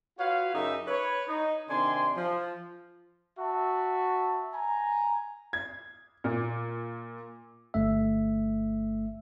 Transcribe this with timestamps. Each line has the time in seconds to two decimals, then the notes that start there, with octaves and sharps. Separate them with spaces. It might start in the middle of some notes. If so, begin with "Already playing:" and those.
0.18 F4 F#4 B4 C#5 F5
0.53 F#2 C#3 D#4 G4 A#4 E5
0.87 B4 C#5
1.27 D#4
1.69 C3 D#3 D4 G#5 C6
2.16 F3
3.37 F#4 E5 A5
4.52 G#5 A#5
5.53 G#6
6.24 A#2
7.74 G1 A3 E5